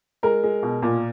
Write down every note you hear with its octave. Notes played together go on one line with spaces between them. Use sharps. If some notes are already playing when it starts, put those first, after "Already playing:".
G#3 A#4
G#3
B2
A#2